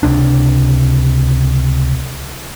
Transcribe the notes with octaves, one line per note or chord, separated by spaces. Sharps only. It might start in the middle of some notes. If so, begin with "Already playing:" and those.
C#2 C3 D4